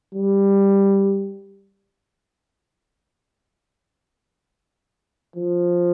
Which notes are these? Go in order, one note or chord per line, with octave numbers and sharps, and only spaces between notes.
G3
F3